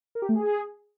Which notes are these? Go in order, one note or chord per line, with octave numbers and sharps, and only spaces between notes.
A#4
G4
A3
G#4